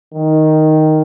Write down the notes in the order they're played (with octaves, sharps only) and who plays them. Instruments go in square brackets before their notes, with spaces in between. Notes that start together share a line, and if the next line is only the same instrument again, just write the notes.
[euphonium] D#3